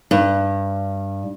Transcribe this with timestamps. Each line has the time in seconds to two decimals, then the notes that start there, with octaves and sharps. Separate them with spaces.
0.11 G2